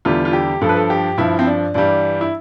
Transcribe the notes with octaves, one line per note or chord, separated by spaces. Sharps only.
E2 D3 G3 F4
F4
G4
G2 F3 A4
B4
A4
G4
G2 F3 E4
C4
D4
G2 E3 G3 D4
E4